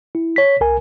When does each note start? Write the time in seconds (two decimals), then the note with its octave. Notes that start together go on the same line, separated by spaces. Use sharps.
0.15 E4
0.36 C#5 B6
0.61 B1 A#4 G#5